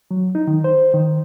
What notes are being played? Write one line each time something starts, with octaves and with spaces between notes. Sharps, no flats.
F#3
D#4
D#3
C5
D#3